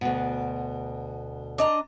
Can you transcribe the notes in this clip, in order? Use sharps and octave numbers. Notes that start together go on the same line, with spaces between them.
D2 B2
D4 D#5 A#5